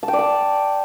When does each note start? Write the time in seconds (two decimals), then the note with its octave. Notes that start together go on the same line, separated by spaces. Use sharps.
0.03 A5
0.08 G5
0.13 D5
0.19 A5